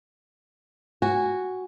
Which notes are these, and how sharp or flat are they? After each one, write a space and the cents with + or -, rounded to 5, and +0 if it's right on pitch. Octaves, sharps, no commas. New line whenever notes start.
F#4 +0 G#5 -10